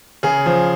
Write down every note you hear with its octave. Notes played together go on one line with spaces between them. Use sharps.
C#3 G#4
F3